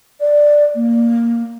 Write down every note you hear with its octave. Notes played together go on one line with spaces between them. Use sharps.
D5
A#3